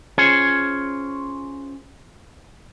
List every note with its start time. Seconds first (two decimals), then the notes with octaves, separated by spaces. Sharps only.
0.18 C#4 F4 G#4 C5 C#5 G#5